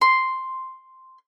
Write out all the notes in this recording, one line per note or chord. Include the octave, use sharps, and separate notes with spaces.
C6